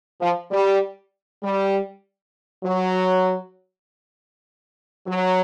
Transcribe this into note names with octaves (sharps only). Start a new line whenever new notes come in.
F3
G3
G3
F#3
F#3